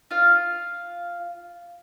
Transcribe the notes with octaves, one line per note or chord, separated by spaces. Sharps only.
F4 F5